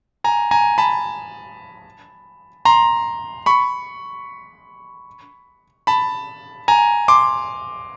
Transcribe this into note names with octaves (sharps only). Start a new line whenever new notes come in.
G#5 A#5
G#5 A#5
A5 B5
A#5 C6
B5 C#6
A5 B5
G#5 A#5
C6 D6